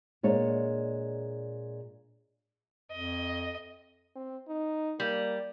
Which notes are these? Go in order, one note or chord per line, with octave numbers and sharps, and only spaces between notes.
A#2 G#3 D4 C#5
F2 D#5
C4
D#4
G3 A#3